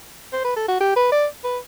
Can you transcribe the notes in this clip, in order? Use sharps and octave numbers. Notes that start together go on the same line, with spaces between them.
C5
B4
A4
F#4
G4
B4
D5
B4